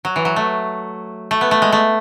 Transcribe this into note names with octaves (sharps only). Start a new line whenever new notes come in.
F#3
E3
F#3
A3
A3
B3
A3
G#3
A3